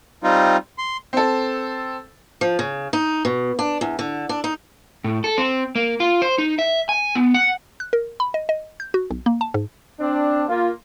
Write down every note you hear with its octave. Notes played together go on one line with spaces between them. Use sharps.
G3 C4 D#4 F4
C6
C4 A4
F3
C#3
D#4
B2
D4
E2
D3
D4
D#4
A2
A4
C4
A#3
F4
C5
D#4
E5
G#5
B3
F#5
F#6
A#4
B5
D#5
D#5
G6
F#4
B1
A#3
A5
G#2
C4 D4
A#3 F4